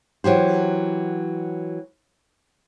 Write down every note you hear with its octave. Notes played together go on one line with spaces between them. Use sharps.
E3 F#3 G4 C5